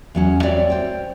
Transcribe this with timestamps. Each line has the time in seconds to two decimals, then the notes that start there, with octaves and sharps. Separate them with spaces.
0.15 E2 F#3 C#4
0.43 G3 C4 F#4 C#5 D5 E5
0.70 C5 G5